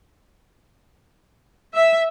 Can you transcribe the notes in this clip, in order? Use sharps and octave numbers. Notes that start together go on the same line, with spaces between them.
E5